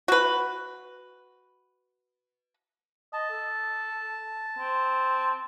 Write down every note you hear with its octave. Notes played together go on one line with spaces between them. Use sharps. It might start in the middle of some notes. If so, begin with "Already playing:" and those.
F#4 B4
D#5 A5
A4
C4